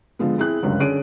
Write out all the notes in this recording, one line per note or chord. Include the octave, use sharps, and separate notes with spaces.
D3 F3 G#3 B3
C4 E4 G#4 F#6
G1 C#2 F#2
D3 C#4 G#4 D7 D#7